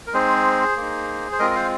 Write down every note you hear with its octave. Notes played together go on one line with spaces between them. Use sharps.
A#4
G#3 C4 D#4 G#4 C5
A#3 D#4
C5
G#3 C4 F4 A#4 D#5
D#5
C5 F5